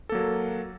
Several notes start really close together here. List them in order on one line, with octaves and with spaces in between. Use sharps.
A4 A#3 F#3